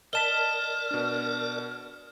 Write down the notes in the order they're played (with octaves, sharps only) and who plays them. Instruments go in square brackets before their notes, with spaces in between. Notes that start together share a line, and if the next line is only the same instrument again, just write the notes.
[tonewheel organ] A#4 D5 [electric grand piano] D#5 A5 B6 [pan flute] F6 [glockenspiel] E7 G7
[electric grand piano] B2 D4